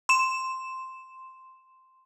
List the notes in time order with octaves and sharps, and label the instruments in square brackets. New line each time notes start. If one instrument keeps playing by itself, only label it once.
[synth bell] C6 E7